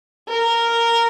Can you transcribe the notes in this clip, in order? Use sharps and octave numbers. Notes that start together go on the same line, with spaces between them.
A#4